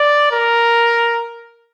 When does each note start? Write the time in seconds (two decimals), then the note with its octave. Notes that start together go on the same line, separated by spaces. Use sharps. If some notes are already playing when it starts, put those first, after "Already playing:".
Already playing: D5
0.32 A#4